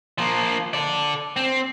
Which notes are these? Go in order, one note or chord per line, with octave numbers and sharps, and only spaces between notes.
F3 A#3
A4 D5
C4